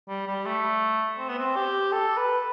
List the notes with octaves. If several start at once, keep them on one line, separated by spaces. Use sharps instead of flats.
G3
G3
A3
C4
B3
C4
G4
A4
B4